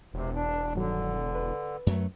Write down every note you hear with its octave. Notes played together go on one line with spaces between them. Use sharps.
E1 C3
D4
G2 D3 D#3 F#3
B4
F#2 F#3 A3